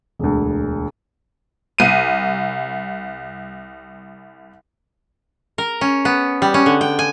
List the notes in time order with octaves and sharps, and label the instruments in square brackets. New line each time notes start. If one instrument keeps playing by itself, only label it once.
[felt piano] E1 D2
[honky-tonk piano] C2 D#7
[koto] A#4
C#4
B3
G3
C#4
D3
G5
G#5